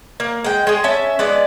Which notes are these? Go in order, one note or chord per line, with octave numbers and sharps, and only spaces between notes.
A#3
G#3 G5
G#3 G#4
C#4 E5 A5
G#3 B3 D5